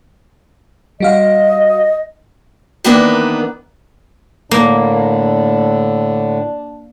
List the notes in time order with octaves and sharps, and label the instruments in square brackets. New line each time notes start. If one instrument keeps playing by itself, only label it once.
[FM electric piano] G3 F#4 F5 [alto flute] D#5
[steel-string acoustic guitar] D#3 E3 A#3 B3 D4
[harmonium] A2 D3 [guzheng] A#3 [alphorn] D4